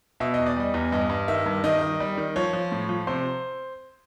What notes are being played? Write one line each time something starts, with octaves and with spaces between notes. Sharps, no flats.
B2 E5
E2 D#5
D5
G3 D#5
E2
G2 D#5
G2
D#3 E5
G2
D#3 D#5
D#3
G3
D#3
F3 C#5
F3
A2
F3
C3 C5